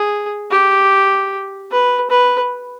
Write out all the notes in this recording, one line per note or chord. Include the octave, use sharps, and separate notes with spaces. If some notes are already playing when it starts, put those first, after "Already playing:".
Already playing: G#4
G4
B4
B4